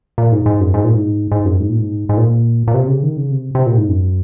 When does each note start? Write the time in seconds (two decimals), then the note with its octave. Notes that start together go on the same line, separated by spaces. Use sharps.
0.18 A#2
0.32 G#2
0.46 G#2
0.60 F#2
0.74 G#2
0.84 A#2
0.94 G#2
1.32 G#2
1.45 F#2
1.60 G#2
1.70 A#2
1.79 G#2
2.09 G#2
2.17 A#2
2.68 A#2
2.74 C3
2.88 C#3
3.03 D#3
3.17 C#3
3.31 C3
3.55 C3
3.66 A#2
3.77 G#2
3.89 F#2